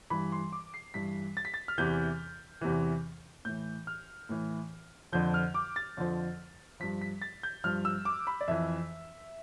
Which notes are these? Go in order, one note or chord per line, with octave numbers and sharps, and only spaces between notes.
G2 E3 B5
C6
D6
C7
G2 E3 B6
A6
B6
A6
F6
E2 C3 E3 G6
E2 C3 E3
A2 E3 G6
F6
A2 E3
F2 D3 F3 G6
F6
D6
A6
F2 D3 F3
G2 F3 B6
B6
A6
G6
G2 F3 F6
E6
D6
B5
D5
F2 E3 E5